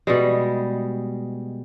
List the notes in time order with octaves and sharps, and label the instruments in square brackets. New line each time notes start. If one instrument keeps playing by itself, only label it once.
[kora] B2 G3 G#3